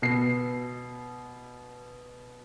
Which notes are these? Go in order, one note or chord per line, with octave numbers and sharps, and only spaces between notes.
B2 C7